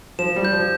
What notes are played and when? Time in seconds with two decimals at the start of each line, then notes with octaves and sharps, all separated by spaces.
0.19 F3 E7
0.36 G3
0.45 G6
0.53 F3